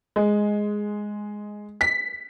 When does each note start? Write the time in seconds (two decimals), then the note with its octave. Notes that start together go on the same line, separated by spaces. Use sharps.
0.16 G#3
1.81 B6